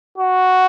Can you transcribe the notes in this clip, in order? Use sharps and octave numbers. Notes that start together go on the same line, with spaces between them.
F#4